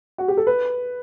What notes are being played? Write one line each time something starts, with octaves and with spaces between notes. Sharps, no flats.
F#4
G4
A4
B4